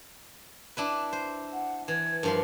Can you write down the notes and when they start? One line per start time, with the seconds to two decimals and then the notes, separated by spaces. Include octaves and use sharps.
0.77 D4 E4 B4
1.13 C5
1.53 F#5
1.88 E3 G#6
2.23 G2 F3 A#4 C6